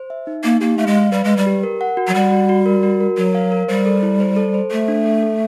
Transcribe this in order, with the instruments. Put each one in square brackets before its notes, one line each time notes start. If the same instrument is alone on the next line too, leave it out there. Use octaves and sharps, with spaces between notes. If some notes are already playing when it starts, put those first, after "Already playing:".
Already playing: [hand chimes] C5
E5
D#4
[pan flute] A#3 [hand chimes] D#4
[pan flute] A#3 [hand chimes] G4
[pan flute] A3 [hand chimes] F5
[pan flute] G#3
[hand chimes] F5
[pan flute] G3 [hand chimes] B4
[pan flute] G#3 [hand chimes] B4
[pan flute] G3
[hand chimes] G4
A#4
F#5
F#4
[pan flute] F#3
[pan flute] G3 [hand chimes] F#5
[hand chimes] F#4
F#4
A#4
F#4
A#4
[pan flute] F#3 [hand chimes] A#4
[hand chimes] F5
A#4
[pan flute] G3 [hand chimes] C5
[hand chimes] A4
E4
C5
A4
C5
[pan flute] A3 [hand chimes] A4
[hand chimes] D4
A4
A4